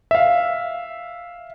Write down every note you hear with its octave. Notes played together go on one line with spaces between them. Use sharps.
E5 F5